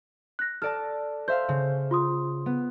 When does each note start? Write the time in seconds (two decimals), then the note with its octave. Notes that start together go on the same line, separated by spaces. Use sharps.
0.39 F#6 A#6
0.62 A4 D5 A5 F6
1.28 C5 E5 F5 G6
1.49 C#3
1.91 F4 C6 D#6
2.46 B3